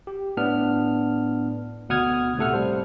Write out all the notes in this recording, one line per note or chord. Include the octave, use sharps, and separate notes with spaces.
G4
A2 B3 D4 F6
D2 B2 F#5 D#6 F6 G#6
A2 C3 A3 A4 F#5 F6
G3 C5